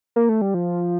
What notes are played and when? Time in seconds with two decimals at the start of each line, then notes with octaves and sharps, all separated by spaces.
0.16 A#3
0.29 A3
0.41 G3
0.54 F3